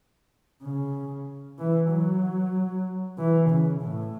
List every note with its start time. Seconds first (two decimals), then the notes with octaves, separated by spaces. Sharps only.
0.63 C#3
1.59 E3
1.91 F#3
3.18 E3
3.50 C#3
3.82 A2